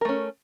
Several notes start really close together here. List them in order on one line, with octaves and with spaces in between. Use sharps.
A#4 A3 C#4